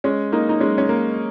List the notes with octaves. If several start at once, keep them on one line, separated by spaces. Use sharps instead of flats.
G#3 C#4
A#3 D#4
D#4
G#3 C#4
C#4
A#3